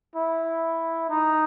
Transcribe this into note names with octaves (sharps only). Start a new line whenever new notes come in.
E4
D#4